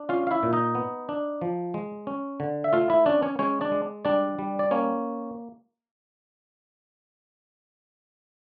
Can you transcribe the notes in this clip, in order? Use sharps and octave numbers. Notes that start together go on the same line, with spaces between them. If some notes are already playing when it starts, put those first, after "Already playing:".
Already playing: D4
C#4 F4 F5
F5
E4 E5
A#2
D#4 D#5
B3
D4
F3
G#3
C#4
D3
E5
A3 F4 F5
E4 E5
C#4 D4 D5
C#4 C#5
G#3 C#4 C#5
D4 D5
G#3
G3 D4 D5
G3
D5
A#3 C#4 C#5